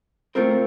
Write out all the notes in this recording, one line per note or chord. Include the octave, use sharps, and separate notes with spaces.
A3 C4 F4 A#4